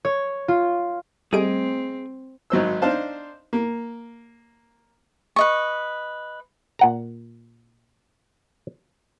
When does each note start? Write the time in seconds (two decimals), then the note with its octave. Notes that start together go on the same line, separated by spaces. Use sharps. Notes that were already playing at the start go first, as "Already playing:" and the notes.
0.05 C#5
0.48 F4
1.33 G3 A3 C4 G#4 D#5 G#5 D7
2.50 G#1 F#3 C5 E6
2.82 D4 D#4 C5 F5 A5
3.53 A#3
5.36 B4 D#5 C#6
6.79 A#2 F#5 A#5